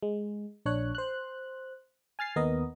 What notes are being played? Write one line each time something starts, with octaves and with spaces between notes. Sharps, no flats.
G#3
A#1 D4 C#5 F#6
C5 F#6
G#5 F6 A6 C7
D#2 B3 A#4 D#5